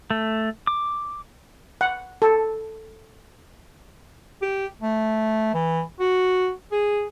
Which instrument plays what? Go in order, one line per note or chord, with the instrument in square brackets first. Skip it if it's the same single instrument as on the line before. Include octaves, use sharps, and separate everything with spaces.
[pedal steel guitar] A3
D6
[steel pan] F#5
A4
[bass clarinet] G4
A3
E3
F#4
G#4